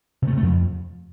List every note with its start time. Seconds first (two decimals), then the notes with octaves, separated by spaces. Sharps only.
0.22 C3
0.27 A3
0.32 C3
0.38 A3
0.43 F2